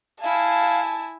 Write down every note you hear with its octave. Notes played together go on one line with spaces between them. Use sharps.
E4 F5 G#5 A5